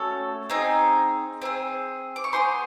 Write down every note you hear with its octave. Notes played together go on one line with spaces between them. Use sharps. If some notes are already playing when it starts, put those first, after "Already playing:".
Already playing: A3 C#4 F#4 A4 C#5
C4 D#4 G#4
C4 D#4 G#4
D6
C#6
B3 D#4 G#4 C5 C6